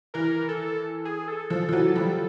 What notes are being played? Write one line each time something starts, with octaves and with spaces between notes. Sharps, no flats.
E3 A#4
A4
G#4
A4
F3 A4
F3
E3 F#3
F3 G3